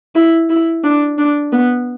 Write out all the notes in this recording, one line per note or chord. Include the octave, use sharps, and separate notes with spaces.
E4
E4
D4
D4
B3